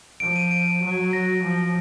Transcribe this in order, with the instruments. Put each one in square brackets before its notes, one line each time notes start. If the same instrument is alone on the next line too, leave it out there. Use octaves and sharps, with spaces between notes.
[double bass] F3 [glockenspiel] D7
[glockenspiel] D#7
D7
[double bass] F#3
[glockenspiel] A#6
[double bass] F3